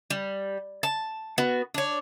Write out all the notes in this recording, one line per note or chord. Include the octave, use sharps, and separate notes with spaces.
G3
A5
B3 F#4
D4 C#5